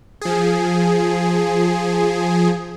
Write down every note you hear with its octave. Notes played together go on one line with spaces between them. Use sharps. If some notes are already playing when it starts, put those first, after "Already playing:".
F3 G#4